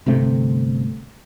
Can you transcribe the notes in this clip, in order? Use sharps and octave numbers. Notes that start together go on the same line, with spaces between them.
G1 C3 A3 C4